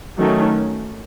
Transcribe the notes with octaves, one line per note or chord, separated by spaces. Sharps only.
D#3 F#3 A3 C#4